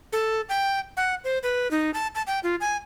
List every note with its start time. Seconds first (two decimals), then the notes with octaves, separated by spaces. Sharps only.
0.13 A4
0.49 G5
0.97 F#5
1.24 C5
1.43 B4
1.71 D#4
1.94 A5
2.15 A5
2.27 G5
2.43 F4
2.61 G#5